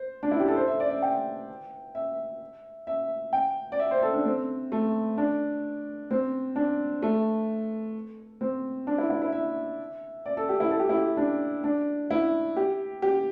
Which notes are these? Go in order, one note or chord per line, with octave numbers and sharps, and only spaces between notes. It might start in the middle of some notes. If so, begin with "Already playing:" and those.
Already playing: C5
D4
E4
G4
A4
C5
E5
D5
E5
G5
E5
E5
G5
D5
E5
C5
A4
D4
C4
A3
D4
C4
D4
A3
C4
D4
E4
E4
E4
E5
D5
A4
G4
E4
A4
G4
E4
G4
D4
D4
E4
G4
G4